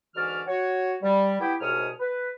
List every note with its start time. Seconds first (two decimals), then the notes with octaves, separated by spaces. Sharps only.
0.15 G#2 D3 E3 F#4 D5 F6
0.47 F#4 C#5
1.03 G3
1.40 B3 E4 G4 G5
1.61 C2 G#2 B2 C#5 D#6 F6
1.99 B4